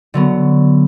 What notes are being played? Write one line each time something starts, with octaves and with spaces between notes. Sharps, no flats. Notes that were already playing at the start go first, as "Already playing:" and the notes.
D3 F#3 B3